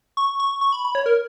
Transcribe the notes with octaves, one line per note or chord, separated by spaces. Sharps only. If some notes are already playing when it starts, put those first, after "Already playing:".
C#6
C#6
C#6
B5
B5
C#5
A#4